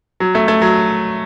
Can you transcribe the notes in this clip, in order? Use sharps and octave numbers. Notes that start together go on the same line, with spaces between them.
F#3
A3
A3
F#3